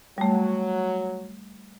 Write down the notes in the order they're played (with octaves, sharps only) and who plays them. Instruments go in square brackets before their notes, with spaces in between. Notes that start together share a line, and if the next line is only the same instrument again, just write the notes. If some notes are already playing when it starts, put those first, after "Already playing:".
[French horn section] F#3 [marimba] G3 A3